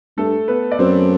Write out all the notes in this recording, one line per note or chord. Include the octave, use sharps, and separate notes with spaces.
G2 A3 A4
B3 B4
D5
F#2 C4 C5